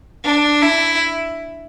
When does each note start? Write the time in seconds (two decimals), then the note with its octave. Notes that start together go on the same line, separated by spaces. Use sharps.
0.24 D4
0.62 E4